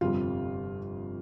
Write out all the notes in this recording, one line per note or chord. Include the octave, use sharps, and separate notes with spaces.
G1 F2 C3 G3 F4